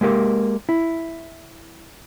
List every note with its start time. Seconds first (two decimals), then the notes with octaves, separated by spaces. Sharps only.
0.01 G#3 A#3 G4 A#4
0.69 E4